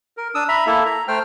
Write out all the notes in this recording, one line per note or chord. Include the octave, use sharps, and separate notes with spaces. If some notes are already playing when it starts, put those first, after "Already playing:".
A#4
D4 D#6 E6
E5 A#5 B5
A#3 E4 A4 E5
A#5
A3 C5 G5 F6